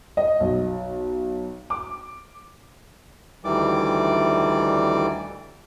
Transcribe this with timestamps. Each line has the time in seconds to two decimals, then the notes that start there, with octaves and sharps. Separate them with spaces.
0.17 D#5
0.40 B1
1.70 D6
3.44 D2 D#3 E3 G3 D5 D6